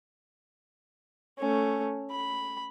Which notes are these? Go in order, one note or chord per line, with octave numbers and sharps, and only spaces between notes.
A3 C#4
B5